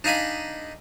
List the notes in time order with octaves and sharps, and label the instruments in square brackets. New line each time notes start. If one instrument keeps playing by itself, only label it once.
[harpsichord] D4 D#4 F5 G#5 B5